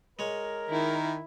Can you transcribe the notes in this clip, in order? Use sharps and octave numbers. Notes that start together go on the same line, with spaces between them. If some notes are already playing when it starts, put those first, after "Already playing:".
G#3 A#4 C#5
D#3 E4